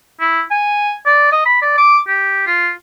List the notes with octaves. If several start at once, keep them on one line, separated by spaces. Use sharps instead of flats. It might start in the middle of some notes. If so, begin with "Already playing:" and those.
E4
G#5
D5
D#5
B5
D5
D6
G4
F4